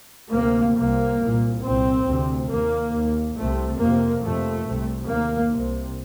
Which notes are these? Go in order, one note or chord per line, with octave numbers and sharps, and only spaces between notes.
D2 C3 A#3
C2 C3 A#3
C2 A#2
C2 A#2 C4
D2 C3
D#2 A#3
D#2
C2 C3 A3
F2 C3 A#3
F2 C3 A3
C2 C3
D#2 A#3
C2 C3